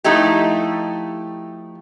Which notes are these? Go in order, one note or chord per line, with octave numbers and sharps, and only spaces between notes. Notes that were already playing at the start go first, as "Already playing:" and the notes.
F3 A3 D#4 E4 G4